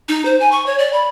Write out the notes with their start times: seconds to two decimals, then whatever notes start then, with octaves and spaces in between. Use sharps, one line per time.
0.08 D#4
0.25 C5
0.40 G#5
0.52 C#6
0.66 C#5
0.79 D5
0.93 B5